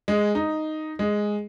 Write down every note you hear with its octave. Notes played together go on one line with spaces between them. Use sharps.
G#3
D#4
G#3